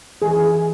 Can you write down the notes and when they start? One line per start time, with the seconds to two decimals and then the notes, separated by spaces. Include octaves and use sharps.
0.22 E3 G#4
0.36 E3
0.52 E4